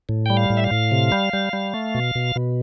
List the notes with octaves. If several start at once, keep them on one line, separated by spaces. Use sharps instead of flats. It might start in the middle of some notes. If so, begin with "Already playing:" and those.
A2
G3 G5
F5
A2
E5
F5
A2
C3
G3
G3
G3
A3
B2
B2
B2